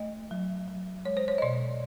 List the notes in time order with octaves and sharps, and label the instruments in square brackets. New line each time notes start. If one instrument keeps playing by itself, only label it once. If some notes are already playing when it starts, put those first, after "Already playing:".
Already playing: [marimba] A3 D#5
F#3
F#3
G#3 C#5
C5
C#5
D#5
B2 D5